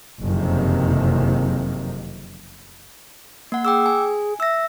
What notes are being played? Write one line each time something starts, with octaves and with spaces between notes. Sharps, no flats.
F#1 F2 C3 D#3
A#3 F#5
G#4 G5 D6 E6
G#5
E5 E6 A#6